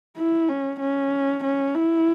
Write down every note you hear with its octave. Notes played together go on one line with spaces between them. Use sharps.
E4
C#4
C#4
C#4
E4